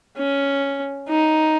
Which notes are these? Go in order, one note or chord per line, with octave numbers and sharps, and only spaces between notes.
C#4
D#4